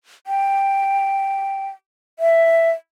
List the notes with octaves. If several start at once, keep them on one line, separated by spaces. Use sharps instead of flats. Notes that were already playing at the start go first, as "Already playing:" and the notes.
G5
E5